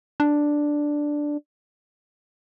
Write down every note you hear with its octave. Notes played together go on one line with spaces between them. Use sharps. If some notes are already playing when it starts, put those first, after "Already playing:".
D4